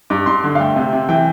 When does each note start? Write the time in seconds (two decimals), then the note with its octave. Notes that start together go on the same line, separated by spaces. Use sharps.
0.10 G2 D6
0.26 G2 C6
0.44 D3
0.55 F5
0.60 A3 G5
0.76 C3
0.93 C3
1.09 E3 G5